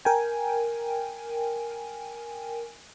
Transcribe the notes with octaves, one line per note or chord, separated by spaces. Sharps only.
A#4 G5 G#5